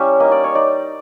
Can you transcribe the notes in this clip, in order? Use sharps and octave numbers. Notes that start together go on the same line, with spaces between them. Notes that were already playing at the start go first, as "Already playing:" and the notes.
Already playing: G3 C#4 E4 E5 A#5
A#3 D#4 D#5
D5
C#5
D#4 D5